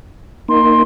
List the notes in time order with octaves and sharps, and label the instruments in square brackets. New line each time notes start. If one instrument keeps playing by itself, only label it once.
[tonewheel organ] A#3 D#4 [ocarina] C6